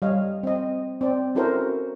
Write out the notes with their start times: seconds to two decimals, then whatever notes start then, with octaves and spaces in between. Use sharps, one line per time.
0.02 G3 C#5 D#5 F5
0.43 C4 D#5
1.01 C4 D5
1.35 C#4 E4 F#4 A4 A#4 C5